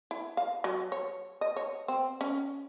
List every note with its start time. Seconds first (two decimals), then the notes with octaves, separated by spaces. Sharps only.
0.11 E4
0.37 F5
0.64 F#3
0.92 C#5
1.41 D#5
1.56 C#5
1.88 C4
2.21 C#4